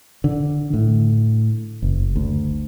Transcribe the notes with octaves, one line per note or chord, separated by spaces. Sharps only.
D3
A2
F#1
D2